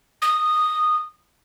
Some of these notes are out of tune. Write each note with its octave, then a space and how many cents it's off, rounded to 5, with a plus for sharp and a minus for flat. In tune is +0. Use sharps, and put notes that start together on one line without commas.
D#6 -10